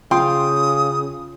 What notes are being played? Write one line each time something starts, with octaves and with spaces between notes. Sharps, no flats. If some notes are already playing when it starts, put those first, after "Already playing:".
C#3 F4 G5 C6 D#6